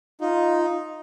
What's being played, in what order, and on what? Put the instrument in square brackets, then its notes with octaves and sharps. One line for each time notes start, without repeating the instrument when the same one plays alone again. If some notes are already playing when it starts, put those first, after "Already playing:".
[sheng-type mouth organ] D#4 [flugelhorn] F4